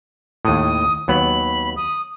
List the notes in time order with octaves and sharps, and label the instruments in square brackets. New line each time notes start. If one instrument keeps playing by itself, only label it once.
[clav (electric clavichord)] D#2 A2 [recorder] D#6
[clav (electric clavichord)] D#2 F#3 B3 [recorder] B5
[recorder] D#6